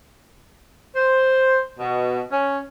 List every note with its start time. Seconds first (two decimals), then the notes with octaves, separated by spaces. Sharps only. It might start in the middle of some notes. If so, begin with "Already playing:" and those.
0.95 C5
1.79 B2
2.31 C#4